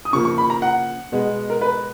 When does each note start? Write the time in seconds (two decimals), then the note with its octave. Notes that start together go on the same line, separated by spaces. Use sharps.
0.05 D#6
0.13 C#3 F3 A#3 C#6
0.25 C#6
0.38 B5
0.50 A#5
0.62 F#5
1.12 B2 G#3 B3
1.50 A#4
1.61 B4